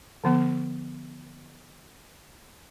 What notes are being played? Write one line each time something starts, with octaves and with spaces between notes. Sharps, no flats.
D3 F3 B3